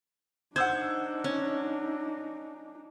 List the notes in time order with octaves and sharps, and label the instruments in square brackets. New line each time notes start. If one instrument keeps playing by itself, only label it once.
[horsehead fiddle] D4 D#4 [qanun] C5 [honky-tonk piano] F#5 E6 G#6
[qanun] C#4